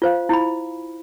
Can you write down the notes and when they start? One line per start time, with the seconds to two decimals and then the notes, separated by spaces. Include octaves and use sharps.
0.02 F4 C5 F5
0.29 E4 B5